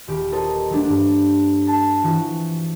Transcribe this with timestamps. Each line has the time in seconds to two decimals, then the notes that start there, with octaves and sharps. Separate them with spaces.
0.08 D#1 G4 D6
0.32 A4 A#4 C5 D#5
0.70 F#3 A3 D4
0.89 G2 A3 D5
1.67 A5
2.03 E3 F3 F#4